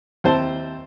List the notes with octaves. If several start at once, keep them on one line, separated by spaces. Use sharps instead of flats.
D#2 C4 E4 C5 A5